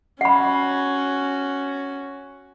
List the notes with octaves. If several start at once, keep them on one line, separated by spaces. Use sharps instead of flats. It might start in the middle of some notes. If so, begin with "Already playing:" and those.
C#4 F#4 F#5 B5